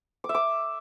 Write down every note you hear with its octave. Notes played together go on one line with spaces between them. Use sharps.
D6
E5
D6